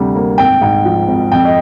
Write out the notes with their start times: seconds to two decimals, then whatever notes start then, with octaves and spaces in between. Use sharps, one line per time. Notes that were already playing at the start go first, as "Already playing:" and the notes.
Already playing: D2 C3 G3
0.15 A#3
0.38 G#1 G5
0.62 G#2
0.85 F3
1.08 G#1
1.32 F2 G5
1.45 D#5